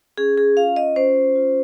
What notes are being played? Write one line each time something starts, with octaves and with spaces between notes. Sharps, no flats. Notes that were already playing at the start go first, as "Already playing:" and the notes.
C#4 G#4
G#4
F4 F5
D#5
C#4 C5
F4